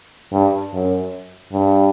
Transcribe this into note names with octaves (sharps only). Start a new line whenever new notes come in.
G2
F#2
G2